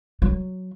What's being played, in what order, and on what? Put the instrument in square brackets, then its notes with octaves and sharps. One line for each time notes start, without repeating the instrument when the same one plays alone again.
[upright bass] F#3